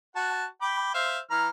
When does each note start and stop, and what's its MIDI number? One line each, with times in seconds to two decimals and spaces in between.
0.16 0.45 66
0.16 0.45 78
0.16 0.45 81
0.62 0.93 79
0.62 0.93 83
0.62 0.93 86
0.94 1.18 72
0.94 1.18 76
0.94 1.18 77
1.31 1.48 52
1.31 1.48 82
1.31 1.48 89